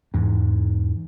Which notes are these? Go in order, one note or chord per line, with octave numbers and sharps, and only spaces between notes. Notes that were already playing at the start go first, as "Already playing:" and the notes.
E2 G#2